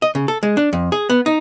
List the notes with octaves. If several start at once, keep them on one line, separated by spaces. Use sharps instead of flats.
D#5
C#3
A4
G#3
D4
F2
G#4
B3
D#4